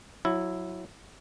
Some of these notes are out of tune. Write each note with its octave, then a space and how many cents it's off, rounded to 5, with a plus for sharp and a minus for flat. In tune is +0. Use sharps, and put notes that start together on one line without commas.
F#3 -15 E4 +0